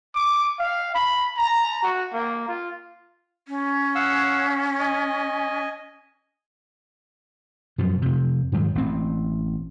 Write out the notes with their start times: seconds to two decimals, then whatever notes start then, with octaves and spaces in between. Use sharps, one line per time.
0.15 D6
0.59 F5
0.95 B5
1.37 A#5
1.83 F#4
2.13 A#3
2.48 F4
3.46 C#4
3.95 F5 F#5 E6
4.79 D#5 G#5
7.78 F#2 B2 F3
8.02 F2 C3
8.52 F2 G#2 D#3 F#3
8.75 A1 C4